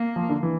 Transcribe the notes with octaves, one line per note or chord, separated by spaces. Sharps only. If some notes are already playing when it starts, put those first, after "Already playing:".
Already playing: A#3
F3
D3
E3